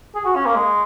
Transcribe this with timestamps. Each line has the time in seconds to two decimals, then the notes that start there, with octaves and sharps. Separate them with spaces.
0.15 G#4
0.25 F#4
0.35 C#4
0.46 A#3
0.55 G#3